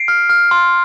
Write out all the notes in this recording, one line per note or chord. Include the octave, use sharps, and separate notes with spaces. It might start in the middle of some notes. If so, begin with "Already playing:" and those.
Already playing: C7 D7
F6
F6
C6